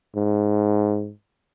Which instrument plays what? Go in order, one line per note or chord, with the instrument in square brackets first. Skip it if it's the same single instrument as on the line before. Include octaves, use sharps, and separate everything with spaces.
[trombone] G#2